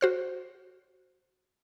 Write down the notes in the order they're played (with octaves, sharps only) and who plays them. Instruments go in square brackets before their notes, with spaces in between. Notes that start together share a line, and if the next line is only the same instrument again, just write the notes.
[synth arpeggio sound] F#4 C5 F6